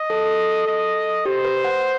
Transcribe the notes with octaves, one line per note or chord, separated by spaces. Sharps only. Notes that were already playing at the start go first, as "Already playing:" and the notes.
Already playing: D#5
A4
D#5
G4 C5
B4
F#5